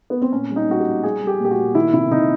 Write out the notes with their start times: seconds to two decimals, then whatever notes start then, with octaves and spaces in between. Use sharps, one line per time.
0.10 B3
0.22 C4
0.32 A#2 C#4
0.51 G3
0.56 D#4
0.68 G3 F#4
0.80 G4
0.86 G3
1.04 G3 G#4
1.22 G3 G4
1.39 A#2 G4
1.51 F#4
1.58 A#2
1.75 D#3 E4
1.93 C3 E4
2.11 C3 D#4